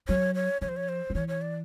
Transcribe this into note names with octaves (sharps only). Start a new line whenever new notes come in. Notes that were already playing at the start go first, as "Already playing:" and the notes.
F#3 C#5
C#5
F3 C#5
C5
C#5
C5
F3
E3 C#5
C#5
D5